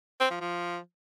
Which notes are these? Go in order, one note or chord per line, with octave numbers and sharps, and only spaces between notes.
C4
F3
F3